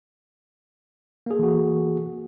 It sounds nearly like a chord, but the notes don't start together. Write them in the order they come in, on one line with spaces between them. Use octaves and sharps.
A#3 G#4 A4 E3 F#4